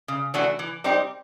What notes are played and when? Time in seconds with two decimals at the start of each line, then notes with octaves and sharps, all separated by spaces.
0.08 C#3
0.34 E3 A3 D4 F#4
0.59 E3
0.84 G3 C4 D#4 G4